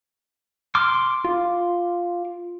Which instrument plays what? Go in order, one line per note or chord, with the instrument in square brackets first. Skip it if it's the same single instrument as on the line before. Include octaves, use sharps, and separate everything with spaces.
[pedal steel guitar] C6 D6 F6
[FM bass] F4